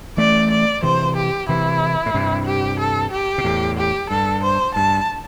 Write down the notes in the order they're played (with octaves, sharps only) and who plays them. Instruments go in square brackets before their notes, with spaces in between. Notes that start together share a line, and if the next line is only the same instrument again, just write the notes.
[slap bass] E3 A3 [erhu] D5
[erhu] D5
[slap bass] C3 E3 [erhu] C5
[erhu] G4
[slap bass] C3 E3 [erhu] E4
[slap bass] A2
G2 C3
[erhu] G4
A4
G4
[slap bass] C3
E2 A2
[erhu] G4
[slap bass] G2 [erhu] A4
[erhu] C5
[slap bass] G2 [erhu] A5